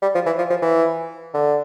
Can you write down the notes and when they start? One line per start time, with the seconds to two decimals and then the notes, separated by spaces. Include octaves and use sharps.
0.02 G3
0.15 F3
0.26 E3
0.38 F3
0.50 F3
0.62 E3
1.34 D3